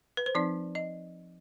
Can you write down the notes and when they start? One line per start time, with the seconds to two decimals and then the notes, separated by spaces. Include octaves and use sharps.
0.17 B4
0.26 C5
0.35 F3 C4 D#4 D5
0.75 D#5